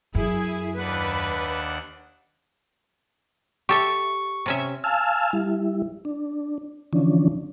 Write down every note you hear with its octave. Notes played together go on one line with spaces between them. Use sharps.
F#2 E4 G#4
D#2 D4 B4 F#5
G4 A4 E5 C#6
C3 C#4 E5
F5 G#5 A5 E6 F6
G3 E4
D4
D3 E3 F3 C#4 D4